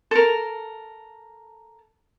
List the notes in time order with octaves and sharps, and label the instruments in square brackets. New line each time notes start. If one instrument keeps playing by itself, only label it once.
[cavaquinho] A4 A#4